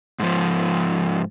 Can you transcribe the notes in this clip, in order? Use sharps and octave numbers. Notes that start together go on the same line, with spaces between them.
G#2 F3